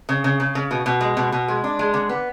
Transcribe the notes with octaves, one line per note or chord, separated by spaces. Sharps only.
C#3
C#3
C#3
C#3
B2
B2
G#3
B2
B2
G#3
D4
G#3
D3
B3